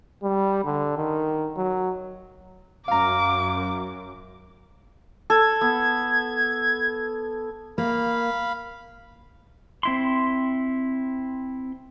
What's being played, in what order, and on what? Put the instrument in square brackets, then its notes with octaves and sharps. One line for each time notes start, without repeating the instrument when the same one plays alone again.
[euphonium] G3
D3
D#3
F#3
[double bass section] F#2 [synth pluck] F5 A#5 [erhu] D6
[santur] A4 [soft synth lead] G#6
[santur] B3
[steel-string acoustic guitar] A#3 [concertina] F5 B5
[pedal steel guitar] C4 E4 C6